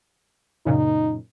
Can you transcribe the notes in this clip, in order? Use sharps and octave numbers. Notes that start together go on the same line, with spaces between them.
F#2 A#2 C#3 D#4